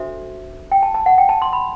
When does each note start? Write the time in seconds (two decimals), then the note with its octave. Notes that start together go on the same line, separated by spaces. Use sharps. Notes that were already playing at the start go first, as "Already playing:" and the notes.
Already playing: D4 F#4 A4 C5 E5
0.72 G5
0.83 A5
0.94 A5
1.06 F#5
1.18 G5
1.29 A5
1.42 C6
1.53 B5